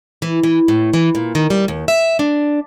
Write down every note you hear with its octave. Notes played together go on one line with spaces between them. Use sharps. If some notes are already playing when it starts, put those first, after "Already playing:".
E3
E3
A2
E3
A#2
D#3
G3
D#2
E5
D4